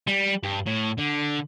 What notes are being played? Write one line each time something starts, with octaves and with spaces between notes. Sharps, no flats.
G3
G2
A2
D3